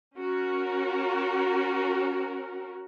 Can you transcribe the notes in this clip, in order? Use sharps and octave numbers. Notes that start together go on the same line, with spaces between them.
C#4 F#4 A#4